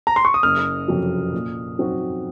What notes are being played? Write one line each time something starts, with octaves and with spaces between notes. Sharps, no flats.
A#5
C6
C#6
D#6
F#1 F6
F2 C3 F#3
A#2
F#3 C4 D#4 F#4